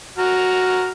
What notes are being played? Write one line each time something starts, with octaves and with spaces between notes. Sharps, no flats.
F#4 A#5 F6